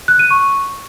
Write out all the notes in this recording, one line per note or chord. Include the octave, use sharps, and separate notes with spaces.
F#6
D#7
C#6